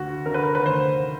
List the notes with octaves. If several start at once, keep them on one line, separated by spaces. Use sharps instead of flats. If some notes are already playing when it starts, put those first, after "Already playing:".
Already playing: D2 D3 F#4
D3 A#4
B4
A#4
B4
D2 C5